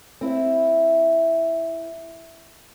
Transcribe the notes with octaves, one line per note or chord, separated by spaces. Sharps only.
C4 E4